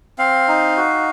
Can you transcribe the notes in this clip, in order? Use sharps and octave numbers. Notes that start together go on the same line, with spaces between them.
C4 F5
D#4
F#4